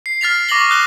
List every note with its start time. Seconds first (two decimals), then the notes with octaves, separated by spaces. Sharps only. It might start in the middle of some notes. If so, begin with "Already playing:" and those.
0.06 C7
0.21 F6 A6 B6 F7
0.49 C#6 D6 A#6 F#7 G7
0.68 D6 D#6 F#6 G7